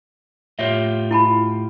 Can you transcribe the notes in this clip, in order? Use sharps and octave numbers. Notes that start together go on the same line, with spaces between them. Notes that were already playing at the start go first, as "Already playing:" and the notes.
A2 F4 G4 C#5 E5
E4 A5 B5